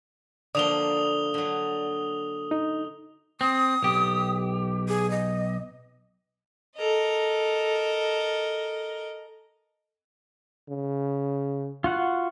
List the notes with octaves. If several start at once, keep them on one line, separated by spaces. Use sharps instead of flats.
D3 F3 A#3 D5 D#6 F7 G7
D3 F#3
D#4
C4 D#6
B1 G4
G#4
D#5
A4 A#4 D#5
C#3
F4 F#4 F#5